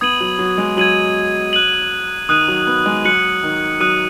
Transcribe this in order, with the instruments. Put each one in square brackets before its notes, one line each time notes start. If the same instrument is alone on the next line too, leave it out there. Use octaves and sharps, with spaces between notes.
[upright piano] B3 [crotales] D#6 G#6 D#7 F#7
[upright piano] F#3
F#3
G#3
[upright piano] F#3 [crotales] G#6 D#7 F#7
[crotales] F#6 D#7 F#7
[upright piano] D#3 [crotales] D#6 F#6 D#7
[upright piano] F#3
B3
G#3
[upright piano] F#3 [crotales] F#6 C#7 F#7
[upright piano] D#3
[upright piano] F#3 [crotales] D#6 F#6 D#7